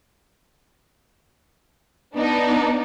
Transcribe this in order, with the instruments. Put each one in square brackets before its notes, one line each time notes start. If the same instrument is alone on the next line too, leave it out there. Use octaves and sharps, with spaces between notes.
[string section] B3 D4 D#4